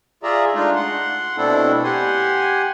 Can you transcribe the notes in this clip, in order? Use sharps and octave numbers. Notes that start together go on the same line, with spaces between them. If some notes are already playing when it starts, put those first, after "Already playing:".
F4 G#4 D5 E5 A#5
G#3 A3 D4 D#4 F4
F#5 C6
B2 A3 C4 D4 E4 A4
G4 F#5 G#5 C6